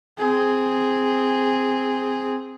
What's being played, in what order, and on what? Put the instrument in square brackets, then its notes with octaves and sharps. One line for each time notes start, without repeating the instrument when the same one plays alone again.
[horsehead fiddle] C4 G#4